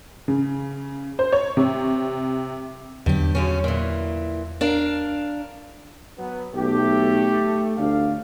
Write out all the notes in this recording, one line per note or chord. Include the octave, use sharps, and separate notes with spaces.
C#3
C5
C#5
C3
E2 G2 D3 F#3 G4
F#2 C#3 C#4
A#2 E3
D4 A#4 F5
F#3 B3
B1 A3 G4
G1 D2 D5 F5